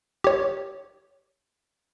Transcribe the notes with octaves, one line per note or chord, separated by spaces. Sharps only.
G4 C#5